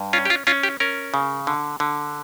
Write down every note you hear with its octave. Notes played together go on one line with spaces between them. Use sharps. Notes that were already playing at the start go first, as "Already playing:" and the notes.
Already playing: G2
C#4 F4
G4
F4
C#4 F4
G4
C#4 A#4
C#3
D3
D3